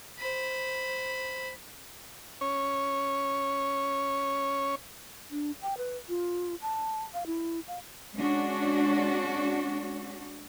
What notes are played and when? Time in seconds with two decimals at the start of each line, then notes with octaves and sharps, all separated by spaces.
0.19 C5 B5
2.41 C#4 C#5
5.31 D4
5.62 G5
5.78 B4
6.09 F4
6.62 A5
7.14 F5
7.27 E4
7.68 F5
8.15 G#3 C#4 D4 F#4